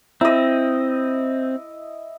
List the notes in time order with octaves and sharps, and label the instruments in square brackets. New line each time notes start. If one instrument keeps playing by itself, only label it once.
[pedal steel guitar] C4 [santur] E4 D#5